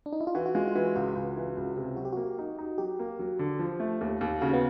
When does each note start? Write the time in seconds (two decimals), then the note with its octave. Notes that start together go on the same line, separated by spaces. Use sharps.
0.06 D4
0.13 D#4
0.21 E4
0.27 F4
0.35 E3 F#4
0.46 F#4
0.55 G#3 F4
0.68 F4
0.75 E3 F#4
0.95 C#2 F#4
1.16 C#2
1.36 E3
1.57 C#2
1.77 C3
1.97 F#3 F#4
2.05 G4
2.13 A#3 F#4
2.38 D#4
2.58 D#4
2.78 F#3 G4
2.99 A#3
3.19 F#3
3.39 D3
3.59 F3
3.80 A3
4.01 D#2
4.21 D#2
4.41 C#3 F#4
4.54 B3